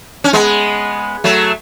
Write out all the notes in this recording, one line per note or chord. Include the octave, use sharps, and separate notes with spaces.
C#4
G#3 B3
F#3 A3